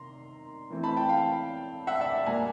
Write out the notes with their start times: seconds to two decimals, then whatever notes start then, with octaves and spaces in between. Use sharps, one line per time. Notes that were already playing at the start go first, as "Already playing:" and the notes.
Already playing: C3 D#3 A#5 C6
0.70 E3 A3 C4
0.83 A5 B5
0.96 G5 A5
1.09 F5 G5
1.87 E5 F#5
2.00 D5 E5
2.26 A#2 G3 A#3 G#5 A#5